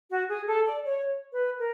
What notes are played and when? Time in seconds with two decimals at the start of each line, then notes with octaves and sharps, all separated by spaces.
0.09 F#4
0.28 G#4
0.47 A4
0.65 D5
0.83 C#5
1.33 B4
1.58 A#4